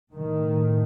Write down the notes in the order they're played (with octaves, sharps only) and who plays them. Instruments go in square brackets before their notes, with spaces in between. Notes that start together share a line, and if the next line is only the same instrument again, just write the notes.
[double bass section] A2 D#3